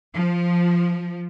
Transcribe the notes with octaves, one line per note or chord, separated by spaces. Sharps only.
F3